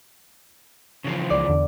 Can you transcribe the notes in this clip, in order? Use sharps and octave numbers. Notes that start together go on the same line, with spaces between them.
C#3 E3 F3
C#2 D5
E2 D3